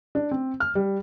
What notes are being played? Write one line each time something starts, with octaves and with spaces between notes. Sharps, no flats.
D4
C4
F6
G3